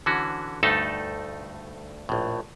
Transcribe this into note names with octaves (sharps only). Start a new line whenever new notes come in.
D3 E3 C#4 F#4
D2 G2 A3 D#4 A4 A5
A#1 A2